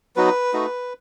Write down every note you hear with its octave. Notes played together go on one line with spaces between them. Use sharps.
F#3 B3 D#4 F#4 B4
A3 D#4 F#4